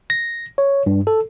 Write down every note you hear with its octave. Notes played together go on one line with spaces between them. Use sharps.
A#6
C#5
G2
A4